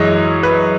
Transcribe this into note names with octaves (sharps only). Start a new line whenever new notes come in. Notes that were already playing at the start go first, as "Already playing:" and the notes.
Already playing: F#2 E3 G#3 C#5 D#5
B4